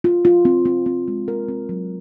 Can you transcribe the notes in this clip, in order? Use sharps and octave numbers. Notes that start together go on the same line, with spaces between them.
F4
F4
C4
C4
C4
G#3
A#4
C4
F#3